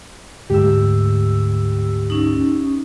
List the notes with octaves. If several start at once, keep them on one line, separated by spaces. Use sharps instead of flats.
D2 G#2 G#3 G4 E6
C#4 D#4